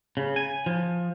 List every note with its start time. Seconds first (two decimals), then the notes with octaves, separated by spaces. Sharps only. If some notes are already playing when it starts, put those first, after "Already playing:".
0.17 C#3
0.36 G#5
0.66 F3